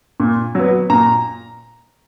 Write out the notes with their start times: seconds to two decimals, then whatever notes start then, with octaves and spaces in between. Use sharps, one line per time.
0.20 A#2
0.55 F#3 B3
0.90 A#2 A#5